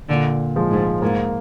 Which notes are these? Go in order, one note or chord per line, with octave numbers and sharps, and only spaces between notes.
A#2 D3
F3 G#3
G#2
G#2 A#3